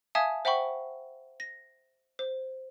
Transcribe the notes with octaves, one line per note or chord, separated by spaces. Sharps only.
E5 F5 G#5 A5 D#6 G#6
C5 E5 F#5 G5 B5 C#6
A#6
C5